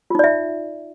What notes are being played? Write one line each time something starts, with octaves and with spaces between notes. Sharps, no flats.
D#4 F4 D5 E5